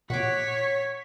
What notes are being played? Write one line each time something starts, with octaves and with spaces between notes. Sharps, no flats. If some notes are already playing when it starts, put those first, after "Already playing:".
A#2 C#5 F#5 C#6 D6 B6